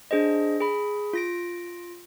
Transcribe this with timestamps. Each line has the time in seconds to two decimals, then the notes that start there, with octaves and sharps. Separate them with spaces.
0.11 D4 G#4 C5 D#5
0.60 G#4 B5
1.13 F4 A#6 D7